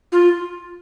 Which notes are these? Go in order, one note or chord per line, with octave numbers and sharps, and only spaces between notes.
F4